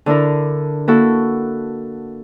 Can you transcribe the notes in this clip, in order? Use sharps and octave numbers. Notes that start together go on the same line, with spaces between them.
D3 D4 E4 A#4
A#3 E4 F#4 A4